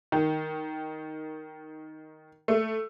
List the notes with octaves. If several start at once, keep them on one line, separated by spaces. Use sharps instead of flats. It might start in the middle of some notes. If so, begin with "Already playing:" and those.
D#3
A3